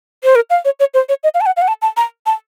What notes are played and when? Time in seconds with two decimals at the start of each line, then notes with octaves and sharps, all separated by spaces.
0.24 C5
0.35 A#4
0.50 F5
0.65 C#5
0.80 C#5
0.94 C5
1.09 C#5
1.24 D#5
1.35 F5
1.41 A5
1.46 F#5
1.57 F5
1.62 F#5
1.68 A5
1.82 A5
1.97 A#5
2.26 A5